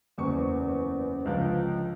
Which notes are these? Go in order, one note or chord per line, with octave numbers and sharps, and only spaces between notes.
F#1 E2 C#4 B4 C5 C#6
C#2 D3 F3